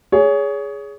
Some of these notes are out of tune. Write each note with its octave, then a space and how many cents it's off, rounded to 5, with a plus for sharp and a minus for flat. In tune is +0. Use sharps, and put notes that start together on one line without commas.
G#4 +0 C#5 +25